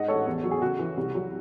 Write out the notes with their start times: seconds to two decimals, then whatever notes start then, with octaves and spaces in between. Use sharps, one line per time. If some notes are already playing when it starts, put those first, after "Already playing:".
Already playing: G#2 D#5 F#5
0.08 A1 A4 C#5
0.26 E2
0.44 F#3
0.51 G#4
0.62 C#3 F#4
0.79 E3
0.97 C2
1.15 F#3